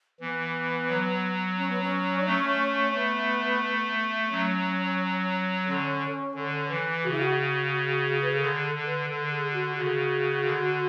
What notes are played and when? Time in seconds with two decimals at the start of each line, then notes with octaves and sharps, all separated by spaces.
0.20 E3 B3
0.89 F#3
1.57 C#4
1.69 B3
1.82 C#4
2.19 D4
2.26 A3 C#4
2.94 B3
4.30 F#3 C#4
5.67 D3 C#4
6.35 D3
6.69 E3
7.04 C#3 F#4
7.11 E4
7.19 F#4
8.21 B4
8.31 A4
8.40 D3 G#4
8.63 A4
8.74 D3
8.86 B4
9.09 D3 A4
9.25 A4
9.31 G#4
9.48 G#4
9.53 F#4
9.77 C#3 F#4
10.45 D3